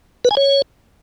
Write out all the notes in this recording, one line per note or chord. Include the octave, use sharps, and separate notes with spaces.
B4
G#5
C#5